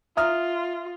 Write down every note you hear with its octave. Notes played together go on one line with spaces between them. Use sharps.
F4 E5 A#5 D#6 F6